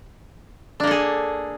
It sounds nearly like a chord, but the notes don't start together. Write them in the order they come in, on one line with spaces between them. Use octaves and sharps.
D4 A#3 A4 G#4